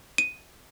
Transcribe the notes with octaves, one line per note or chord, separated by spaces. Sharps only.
D#7